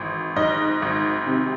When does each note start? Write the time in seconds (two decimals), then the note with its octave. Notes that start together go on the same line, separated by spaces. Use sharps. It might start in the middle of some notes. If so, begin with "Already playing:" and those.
Already playing: G#1 E3
0.36 G#2 D#5
0.82 G#1
1.27 C3